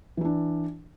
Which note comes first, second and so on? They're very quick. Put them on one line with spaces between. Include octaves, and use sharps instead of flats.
E3 E4 D4